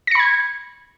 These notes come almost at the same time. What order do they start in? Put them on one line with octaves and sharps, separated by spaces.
A#6 C#7 B5 G#6